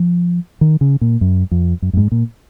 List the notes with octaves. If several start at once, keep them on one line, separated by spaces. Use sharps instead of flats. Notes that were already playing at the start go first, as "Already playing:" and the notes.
Already playing: F3
D#3
C#3
A#2
F#2
F2
F#2
F#2
G#2
A#2